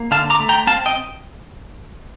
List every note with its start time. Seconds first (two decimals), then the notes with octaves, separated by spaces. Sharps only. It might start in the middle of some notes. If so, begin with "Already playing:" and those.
Already playing: A#3
0.11 D3 F5 A5
0.30 A#5 D6
0.40 A3
0.49 G5 A#5
0.67 C4 F5 A5
0.86 D#5 G5